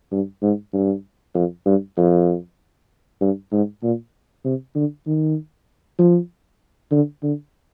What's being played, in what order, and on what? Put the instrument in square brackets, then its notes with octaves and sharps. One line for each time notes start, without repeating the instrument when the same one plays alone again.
[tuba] G2
G#2
G2
F2
G2
F2
G2
G#2
A#2
C3
D3
D#3
F3
D3
D3